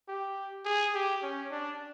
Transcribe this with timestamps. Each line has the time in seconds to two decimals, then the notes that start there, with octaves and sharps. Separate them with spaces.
0.09 G4
0.66 G#4
0.95 G4
1.23 C#4
1.52 D4